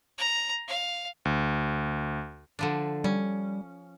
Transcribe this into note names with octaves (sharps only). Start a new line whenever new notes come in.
A#5
F5
D2
D3 F3 D4
G3 C#4